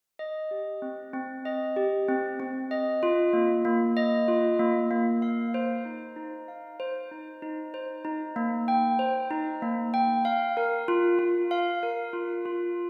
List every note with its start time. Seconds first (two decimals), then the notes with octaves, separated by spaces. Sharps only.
0.19 D#5
0.51 G4
0.82 C4
1.14 C4
1.45 D#5
1.76 G4
2.08 C4
2.40 C4
2.71 D#5
3.03 F4
3.33 A#3
3.65 A#3
3.97 D#5
4.28 F4
4.59 A#3
4.91 A#3
5.22 F5
5.54 C5
5.85 D#4
6.16 D#4
6.48 F5
6.80 C5
7.11 D#4
7.42 D#4
7.74 C5
8.05 D#4
8.36 A#3
8.68 G5
8.99 C5
9.31 D#4
9.62 A#3
9.94 G5
10.25 F5
10.57 A#4
10.88 F4
11.19 F4
11.51 F5
11.83 A#4
12.13 F4
12.46 F4